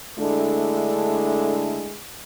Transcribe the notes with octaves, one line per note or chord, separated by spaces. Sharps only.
D3 G#3 A3 D4 E4 A4